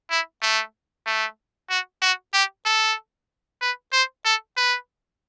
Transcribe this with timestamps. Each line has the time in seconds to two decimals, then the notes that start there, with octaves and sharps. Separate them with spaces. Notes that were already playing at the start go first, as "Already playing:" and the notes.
0.10 E4
0.42 A3
1.06 A3
1.70 F#4
2.02 F#4
2.34 G4
2.65 A4
3.61 B4
3.93 C5
4.25 A4
4.57 B4